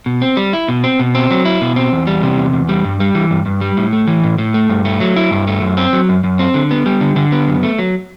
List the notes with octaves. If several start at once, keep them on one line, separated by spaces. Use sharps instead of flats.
B2
C4
G3
E4
B2
C4
B2
C4
F#3
E4
B2
C4
E2
G3
C3
E2
E2
G3
G2
G3
E3
G2
G2
G3
A2
A3
E3
A2
A2
A3
G2
A3
F#3
E4
G2
A3
F#2
C4
F#3
F#2
F#2
C4
D3
B3
G3
D3
D3
B3
F#2
A3
F#3